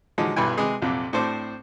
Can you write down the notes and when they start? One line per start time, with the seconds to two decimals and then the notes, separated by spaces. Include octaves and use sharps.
0.18 D3 F3 F#3 G#3 D#4
0.36 B1 G2 E4 B4 G5 G#5
0.57 C3 G#3 G#4 B4
0.82 A#1 F2 C3 F#3
1.13 A2 C4 D4 C5 D6